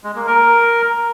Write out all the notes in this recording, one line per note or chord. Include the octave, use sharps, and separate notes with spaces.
G#3
A#3
A#4